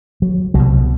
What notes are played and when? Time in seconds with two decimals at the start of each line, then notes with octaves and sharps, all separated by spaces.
0.22 F#3
0.54 C2 B2 F#3